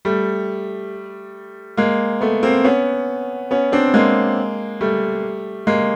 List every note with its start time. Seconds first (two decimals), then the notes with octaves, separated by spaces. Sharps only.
0.05 G3 A3
1.77 G#3 A#3
2.21 A3 B3
2.43 A#3 C4
2.64 B3 C#4
3.51 B3 C#4
3.72 C4 D4
3.94 G#3 A#3
4.81 G3 A3
5.67 G#3 A#3